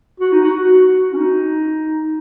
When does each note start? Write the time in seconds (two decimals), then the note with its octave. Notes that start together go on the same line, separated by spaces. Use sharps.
0.20 F#4
0.32 D#4
0.44 F#4
0.57 F#4
1.13 C#4
1.17 D#4